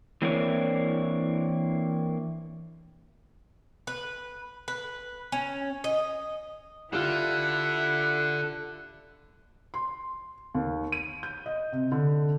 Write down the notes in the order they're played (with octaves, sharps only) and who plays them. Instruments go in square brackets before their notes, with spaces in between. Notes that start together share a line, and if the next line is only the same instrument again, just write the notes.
[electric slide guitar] E3 A#3 C4 D4 E4 C#5
[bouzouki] B4
B4
C#4
D#5
[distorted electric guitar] D3 [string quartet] E4 [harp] F4 G4 [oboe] F#5
[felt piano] C6
D#2
D#7
G6
D#5
C3
D3